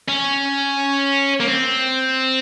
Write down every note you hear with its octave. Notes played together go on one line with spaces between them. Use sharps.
C#4
A#3
C4